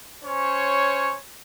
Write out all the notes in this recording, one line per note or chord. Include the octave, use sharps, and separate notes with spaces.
C#4 C5 C#5